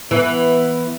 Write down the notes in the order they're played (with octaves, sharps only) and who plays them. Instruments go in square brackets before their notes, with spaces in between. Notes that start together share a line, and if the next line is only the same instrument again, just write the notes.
[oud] E3 [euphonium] B3